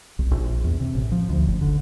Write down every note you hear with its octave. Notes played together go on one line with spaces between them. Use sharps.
C2
A#1
E2
C3
A1
F3
D2
F#1
D3